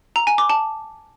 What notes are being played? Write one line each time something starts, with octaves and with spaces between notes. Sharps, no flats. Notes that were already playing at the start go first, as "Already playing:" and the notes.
A#5
G#5
D6
A5